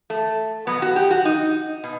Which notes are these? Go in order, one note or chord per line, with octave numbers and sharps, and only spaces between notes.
A3
B2 F#3 B3
F#4
G4
F#4
D#4
B2